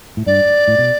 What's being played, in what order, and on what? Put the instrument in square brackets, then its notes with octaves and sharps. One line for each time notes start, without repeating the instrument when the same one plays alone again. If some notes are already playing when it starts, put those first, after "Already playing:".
[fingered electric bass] A2
[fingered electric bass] G2 [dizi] D5
[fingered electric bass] A2
B2